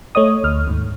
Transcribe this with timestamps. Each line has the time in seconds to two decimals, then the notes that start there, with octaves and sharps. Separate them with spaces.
0.15 A3 C#5 D#5 D#6
0.44 D2 F6
0.67 D#2 G#2